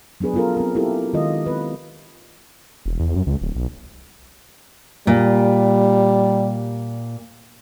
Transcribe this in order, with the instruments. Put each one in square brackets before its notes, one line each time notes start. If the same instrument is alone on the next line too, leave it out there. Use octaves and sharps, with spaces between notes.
[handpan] F#3 B3 D4 G#4 B4
B3 C#4 F4 A4 A#4
C4 A#4
A#3 E4 F4 G4 A4 A#4
D#3 G#3 F4 D#5
C4 B4
[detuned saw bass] E1
E2
F#2
C#2
D1
B1
[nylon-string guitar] A#2 [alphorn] G3